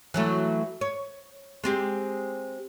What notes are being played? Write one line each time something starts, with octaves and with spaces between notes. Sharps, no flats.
E3 F#3 A3
C#5
G#3 C4 G4